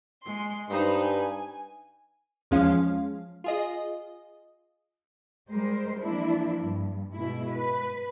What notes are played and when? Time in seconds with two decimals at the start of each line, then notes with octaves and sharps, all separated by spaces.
0.22 G#3 C6
0.70 G2 D#4 B4 C5
1.04 G#5
2.51 E2 F3 G#3 C#4 F5
3.44 F4 G#4 D#5
5.49 G3 G#3 A#4 C5
5.99 E3 F3 A#3 D4 E4
6.58 G2
7.15 B2 G#3 E4
7.52 B4